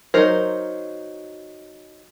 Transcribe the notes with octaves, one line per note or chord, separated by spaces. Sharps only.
F#3 D#4 A#4 C5